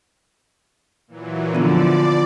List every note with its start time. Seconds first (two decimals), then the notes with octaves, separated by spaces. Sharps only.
1.08 A#2 E3 F#3
1.53 D3 F3 B3 D4 F4 D5